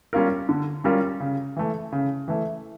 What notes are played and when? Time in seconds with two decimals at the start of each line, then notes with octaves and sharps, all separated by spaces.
0.13 G3 C#4 F4 A#4
0.49 D3
0.84 G3 C#4 F4 A#4
1.20 C#3
1.56 E3 A3
1.92 C#3
2.28 E3 A3